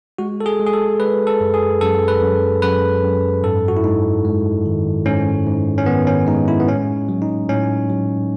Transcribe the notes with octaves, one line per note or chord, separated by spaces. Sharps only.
G#3 F#4
A4
G#4
G#3
G#4
A4
G#3 B4
A4
F#2
G#4
F#2 A4
B4
F#2
F#2 B4
F#2
G#2 A4
F#4
E4
G#2 D#4
G#3
D#3
G#2 C#4
G#2
C#4
D#3 B3
C#4
G#3 D#4
E4
B3
A2 C#4
F#3
D#4
A2 C#4
F#3